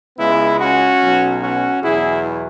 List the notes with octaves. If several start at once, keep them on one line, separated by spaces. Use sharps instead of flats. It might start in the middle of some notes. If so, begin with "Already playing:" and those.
C#2 C#3 G#3 B3 E4
C#4 F#4
B1 B2 F#3
C#4 F#4
E2 B2 F#3 E4 G#4